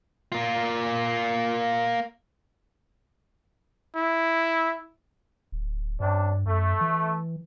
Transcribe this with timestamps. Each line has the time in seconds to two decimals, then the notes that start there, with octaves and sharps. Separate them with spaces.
0.32 A#3 F4
3.96 E4
5.52 D1
6.00 G2 C3 C#4 D4
6.46 F#2 A3
6.81 E3